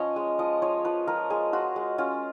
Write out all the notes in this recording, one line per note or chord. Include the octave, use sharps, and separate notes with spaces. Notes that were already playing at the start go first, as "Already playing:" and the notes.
Already playing: F3 C#4 C#5 D#5 F#5
G#3
F3 D#5
F3 C#5
F3 B4
F3 A#4
G#3 G#4
F4 F#4
G#3
C#4 F4